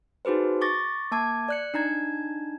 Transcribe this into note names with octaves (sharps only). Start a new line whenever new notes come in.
D#4 F#4 G#4 B4 C5
C#6 D6 A6 A#6
A#3 A5 D6 G#6
D5 F#6 C#7
D4 D#4 A#5 G#6